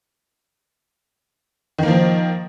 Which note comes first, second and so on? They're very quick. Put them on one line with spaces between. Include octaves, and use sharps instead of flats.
D#3 A#3 F3